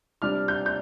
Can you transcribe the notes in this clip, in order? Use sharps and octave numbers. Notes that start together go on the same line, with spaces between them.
C3 G3 D4 F6
G6
G6